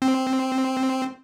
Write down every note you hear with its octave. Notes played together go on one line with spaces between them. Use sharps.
C4